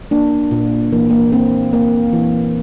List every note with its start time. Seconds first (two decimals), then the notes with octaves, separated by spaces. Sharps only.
0.11 A#3 D4
0.51 A#2
0.92 E3 A#3
1.11 A#3
1.32 A#3 C4
1.73 A#3
2.13 E3